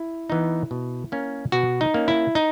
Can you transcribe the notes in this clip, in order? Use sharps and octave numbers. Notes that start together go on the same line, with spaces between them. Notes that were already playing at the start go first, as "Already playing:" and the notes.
Already playing: E4
E3 B3 D#4
B2
A#3 C#4
B2 F#4
D#4
A#3 C#4
E4
D#4